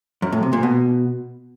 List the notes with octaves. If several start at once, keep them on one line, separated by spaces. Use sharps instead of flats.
F#2
A2
C3
A#2
B2